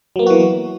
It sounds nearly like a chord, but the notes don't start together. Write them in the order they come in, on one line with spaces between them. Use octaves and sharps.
F#3 A#3 B3 F#4 E3